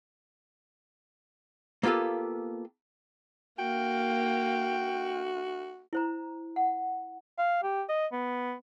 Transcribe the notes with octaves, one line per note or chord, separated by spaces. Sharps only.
A#3 B3 F4 G4 A4
A#3 F#4 F5 G5
E4 C5 A#5
F#5
F5
G4
D#5
B3